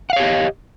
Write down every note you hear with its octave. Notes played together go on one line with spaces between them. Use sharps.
G4 C#5 D#5 F5 F#5